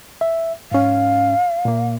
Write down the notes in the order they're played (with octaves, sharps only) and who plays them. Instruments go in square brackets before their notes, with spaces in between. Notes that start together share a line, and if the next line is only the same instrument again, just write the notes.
[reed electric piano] E5
[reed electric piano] G#2 C#4 [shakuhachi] F5
[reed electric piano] A#2 A#3